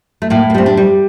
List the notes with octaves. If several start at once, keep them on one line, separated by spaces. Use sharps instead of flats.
A3
A2 A#3
A#3
G3 C4
D4
G3